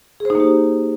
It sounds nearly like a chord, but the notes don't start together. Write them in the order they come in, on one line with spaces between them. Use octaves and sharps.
G#4 C5 D#4 A#3 G4